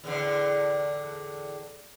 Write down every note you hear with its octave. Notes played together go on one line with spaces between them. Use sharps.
E2 A2 D3